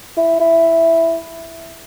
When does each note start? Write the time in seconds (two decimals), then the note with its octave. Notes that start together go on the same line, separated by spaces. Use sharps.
0.17 E4
0.40 E4